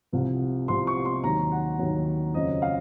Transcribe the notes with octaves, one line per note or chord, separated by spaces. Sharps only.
C2 C3 F3
C2 C3 F3 C6
C#6
C6
D#2 D#3 F#3 A#5
F#5
D#2 D#3 F#3
F2 C#3 F#3 D#5
F5